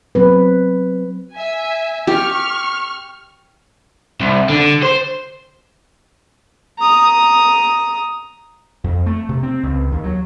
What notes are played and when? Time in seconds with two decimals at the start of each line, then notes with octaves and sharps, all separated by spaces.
0.15 F#3 C4 B4
1.34 E5 G#5
2.07 G4 C#6 F6
4.21 C2
4.49 D3
4.83 C5
6.79 A#5 D#6
8.84 F2
9.06 A3
9.29 C3
9.43 C4
9.63 C#2
9.92 D#2
10.04 F#3